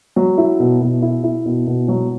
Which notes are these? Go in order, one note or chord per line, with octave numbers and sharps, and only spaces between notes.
F#3
E4
B2
B2
E4
E4
B2
B2
F#3